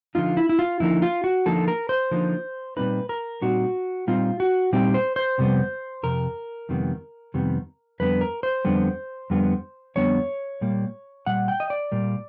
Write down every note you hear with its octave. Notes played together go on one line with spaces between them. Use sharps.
D3 F3 A#3 D#4 F4
E4
E4
F4
D3 F3 A#3 D#4 E4
F4
F#4
D3 F3 A#3 D#4 A4
A#4
C5
D3 F3 A#3 D#4
A#2 G3 C4 D#4 B4
A#4
A#2 G3 C4 D#4 F#4
A#2 G3 C4 D#4 F4
F#4
A#2 G3 C4 D#4 G4
C5
C5
F2 C3 G3 B3
F2 C3 A#4
F2 C3 D#3 G3 B3
F2 C3 D#3 G3 B3
F2 D3 G3 B3 B4
A#4
C5
F2 D3 G3 B3
F2 D3 G3 B3
F2 D3 G3 B3 C#5
A#2 G3 A#3
A#2 G3 F#5
G5
D#5
D5
A#2 G3 A#3